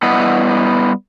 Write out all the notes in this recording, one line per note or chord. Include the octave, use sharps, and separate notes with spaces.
G3 B3 E4 D#5 F#5